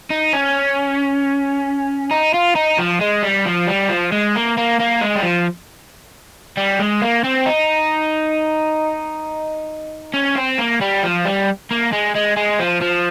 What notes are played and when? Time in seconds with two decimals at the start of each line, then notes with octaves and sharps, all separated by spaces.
0.10 D#4
0.33 C#4
2.11 D#4
2.34 F4
2.55 D#4
2.78 F3
3.01 G#3
3.23 G3
3.46 F3
3.67 G3
3.89 F3
4.12 G#3
4.35 A#3
4.57 A#3
4.79 A#3
5.01 G#3
5.15 G3
5.23 F3
6.57 G3
6.79 G#3
7.02 A#3
7.24 C4
7.46 D#4
10.14 C#4
10.36 C4
10.59 A#3
10.81 G3
11.03 F3
11.25 G3
11.71 A#3
11.93 G#3
12.15 G#3
12.36 G#3
12.59 F3
12.81 F3